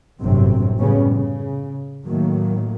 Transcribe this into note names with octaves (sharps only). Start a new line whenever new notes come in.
G1 F#2 A2 C3 F#3 C4
F#2 A2 C#3 G3 B3 C#4
C#3
A2 D#3 F#3 A#3